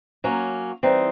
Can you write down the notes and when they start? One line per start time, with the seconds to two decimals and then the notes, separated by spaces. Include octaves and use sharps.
0.24 F#3 A#3 C#4
0.83 E3 G3 C4 D#4